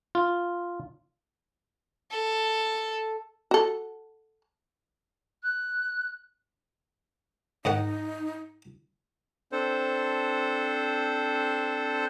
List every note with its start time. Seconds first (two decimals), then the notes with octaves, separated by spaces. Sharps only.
0.15 F4
2.11 A4
3.51 F#4 A4
5.43 F#6
7.65 G#2 D#3 D#4 F#5
9.52 C4 D4 A4 C5